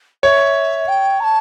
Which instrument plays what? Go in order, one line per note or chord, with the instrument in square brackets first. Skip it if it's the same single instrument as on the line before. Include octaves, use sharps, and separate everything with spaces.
[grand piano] C#5 [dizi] E5
[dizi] G5
A#5
A5